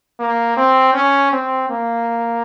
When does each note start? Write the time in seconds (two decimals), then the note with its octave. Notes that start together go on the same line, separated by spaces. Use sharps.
0.19 A#3
0.57 C4
0.94 C#4
1.32 C4
1.70 A#3